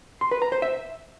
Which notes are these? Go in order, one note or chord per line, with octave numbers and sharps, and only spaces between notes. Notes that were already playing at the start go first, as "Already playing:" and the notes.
C6
B4
A#5
C5
E5